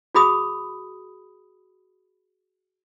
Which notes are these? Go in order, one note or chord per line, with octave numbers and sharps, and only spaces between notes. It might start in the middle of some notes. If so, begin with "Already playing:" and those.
F#4 G#4 B5 D#6